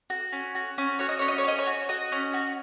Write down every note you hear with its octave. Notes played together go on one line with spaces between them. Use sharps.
F#4
C#4
F#4
C#4
F#4 C#5
D#5
C#4 C#5
D#5
C#5
C#4 D#5
C#5
F#4
F#4 D#5
C#4
F#4